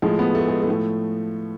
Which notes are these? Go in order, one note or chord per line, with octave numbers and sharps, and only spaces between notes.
A2 F3 G#3
B3
A3
G#3
A3
A2 F3